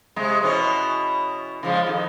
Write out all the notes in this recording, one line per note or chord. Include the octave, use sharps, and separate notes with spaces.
C3 G#3
B2 E3 C#4
C#3 F3 G#3
F2 D#3